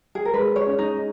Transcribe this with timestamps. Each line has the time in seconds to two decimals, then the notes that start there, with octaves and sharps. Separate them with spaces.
0.15 G#4
0.25 A#4
0.34 G#3 B4
0.56 C#5
0.66 C#4
0.78 D#4